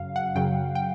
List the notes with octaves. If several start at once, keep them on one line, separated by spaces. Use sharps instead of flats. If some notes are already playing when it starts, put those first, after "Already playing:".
Already playing: F#2 C#3 F#3 F5
F#5
F#2 C#3 F#3 G5
G5